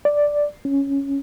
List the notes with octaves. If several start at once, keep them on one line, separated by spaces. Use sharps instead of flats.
D5
C#4